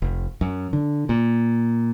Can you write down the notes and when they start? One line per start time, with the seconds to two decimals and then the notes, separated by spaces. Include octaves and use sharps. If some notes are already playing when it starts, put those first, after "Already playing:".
0.02 F1
0.41 F#2
0.73 D3
1.09 A#2